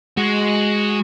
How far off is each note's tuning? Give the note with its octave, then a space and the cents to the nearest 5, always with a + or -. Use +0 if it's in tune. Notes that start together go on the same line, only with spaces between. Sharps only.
G#3 +0 F#4 +0